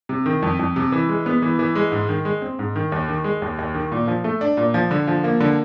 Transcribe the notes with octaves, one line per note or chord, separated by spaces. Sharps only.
C3
D#3
F2
F2
C3
E3
G#3
B3
E3
E3
G#3
G#2
D#3
G#3
C4
G#2
D#3
D#2
D#3
G#3
D#2
D#2
D#3
A#2
F3
A3
D4
A#2
F3
D3
F3
A#3
D3